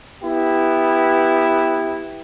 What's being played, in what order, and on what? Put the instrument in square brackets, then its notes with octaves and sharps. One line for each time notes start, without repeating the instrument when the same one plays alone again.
[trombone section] B3 E4 G4